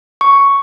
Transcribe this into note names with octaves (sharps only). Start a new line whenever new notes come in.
C#6